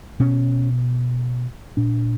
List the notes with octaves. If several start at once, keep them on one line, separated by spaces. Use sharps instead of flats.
B2 C#4
A#2 D4